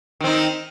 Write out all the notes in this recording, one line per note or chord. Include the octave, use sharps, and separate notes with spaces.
D#3 C4 D#4